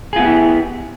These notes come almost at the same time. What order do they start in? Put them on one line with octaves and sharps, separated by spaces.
G#4 F4 B3 G4 E4